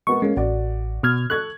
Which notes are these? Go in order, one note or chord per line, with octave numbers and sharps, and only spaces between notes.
G#3 B3 A#4 C#6
G#3 A#3 C#4
A1 F#4 D5
B2 F6 G#6
A4 C#6 F#6 G#6